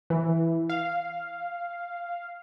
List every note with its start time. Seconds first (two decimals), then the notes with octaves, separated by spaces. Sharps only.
0.10 E3
0.69 F5